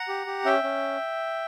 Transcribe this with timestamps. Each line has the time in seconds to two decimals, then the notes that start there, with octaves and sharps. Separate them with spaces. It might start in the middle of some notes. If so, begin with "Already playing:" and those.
Already playing: F#5 A#5
0.08 G4
0.26 G4
0.45 C#4 E5 G5
0.63 C#4